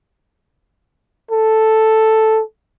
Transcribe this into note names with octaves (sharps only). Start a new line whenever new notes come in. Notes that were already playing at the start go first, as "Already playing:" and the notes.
A4